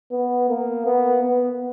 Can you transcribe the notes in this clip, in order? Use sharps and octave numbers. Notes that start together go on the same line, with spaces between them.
B3
A#3
B3
B3